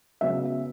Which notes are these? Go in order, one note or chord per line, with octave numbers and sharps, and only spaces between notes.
C#3 F#3 B3 E5